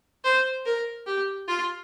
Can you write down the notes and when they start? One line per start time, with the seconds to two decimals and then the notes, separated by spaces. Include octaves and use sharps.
0.24 C5
0.66 A#4
1.06 G4
1.48 F4